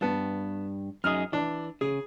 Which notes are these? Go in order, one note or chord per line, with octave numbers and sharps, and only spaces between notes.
G2 B3 A5
F#2 D#4 G#4 D#6 F6
E3 D4
C#3 G#4